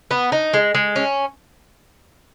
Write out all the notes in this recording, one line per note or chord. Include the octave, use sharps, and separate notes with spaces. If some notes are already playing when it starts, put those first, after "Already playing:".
B3
D#4
G#3
G#3
C#4